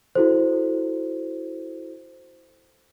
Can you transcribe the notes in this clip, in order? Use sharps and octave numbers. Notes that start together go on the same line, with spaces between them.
E4 F#4 A4 C5